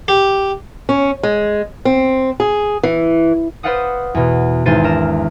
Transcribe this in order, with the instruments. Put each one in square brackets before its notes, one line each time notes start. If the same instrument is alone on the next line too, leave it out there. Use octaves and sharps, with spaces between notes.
[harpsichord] G4
[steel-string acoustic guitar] C#4
G#3
C4
G#4
E3
[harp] B4 C5 D5 F5 F#5 D#6
E2 B2
G#1 E2 C5 A6 D#7
D4 A#4 E7